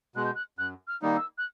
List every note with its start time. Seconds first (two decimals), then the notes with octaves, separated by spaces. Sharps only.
0.16 B2 G#3 F#6
0.25 G6
0.35 F#6
0.58 F#2 F#6
0.88 F6
1.02 D#3 G3 A#3 D#4
1.16 E6
1.38 F#6